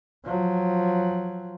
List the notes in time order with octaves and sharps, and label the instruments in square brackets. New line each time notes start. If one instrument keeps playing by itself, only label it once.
[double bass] F3 F#3